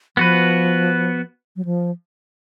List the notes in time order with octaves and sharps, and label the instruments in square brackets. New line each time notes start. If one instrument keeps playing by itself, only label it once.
[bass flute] F3 [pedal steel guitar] B3 F#4 B4
[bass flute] F#3
F3